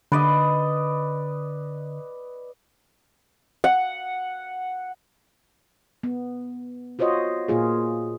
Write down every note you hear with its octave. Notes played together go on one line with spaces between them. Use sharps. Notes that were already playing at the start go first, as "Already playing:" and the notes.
D3 B4 D5 D#5
F#5
B3
F4 F#4 C5 C#5 D#5
A#2 A#3 F4 G#4